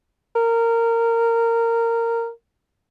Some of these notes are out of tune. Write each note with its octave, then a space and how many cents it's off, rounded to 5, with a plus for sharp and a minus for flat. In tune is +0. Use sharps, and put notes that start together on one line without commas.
A#4 -15